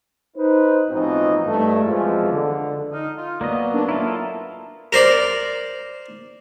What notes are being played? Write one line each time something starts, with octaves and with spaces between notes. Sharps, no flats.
D#4 B4 C5
A1 B2 E3 F3 C4 D#4
G2 A3
F2 B2 E3 F3 G#3
D3
D#4 F6
F4
F#3 A#3 B3 D5 D#5
D4 A#4 B4
A#3 E4 F4 A4 E5 A#5
A#4 C5 D5